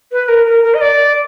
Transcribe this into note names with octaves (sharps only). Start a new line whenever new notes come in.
B4
A#4
A#4
A#4
D#5
D5